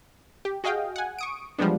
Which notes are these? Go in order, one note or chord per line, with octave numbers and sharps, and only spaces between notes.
G4
F#4 G#4 D#5 F5 G5
F#5 G#5
C#6 D#6 D7
E2 F3 G3 G#3 B3 D4